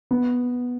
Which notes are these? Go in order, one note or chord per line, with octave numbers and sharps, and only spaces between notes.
B3